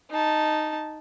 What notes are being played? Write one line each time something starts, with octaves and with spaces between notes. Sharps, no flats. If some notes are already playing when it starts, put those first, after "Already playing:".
D#4 A5